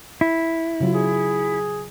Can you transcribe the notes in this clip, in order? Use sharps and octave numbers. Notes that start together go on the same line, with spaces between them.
E4
C#3 F#3 F4
G#4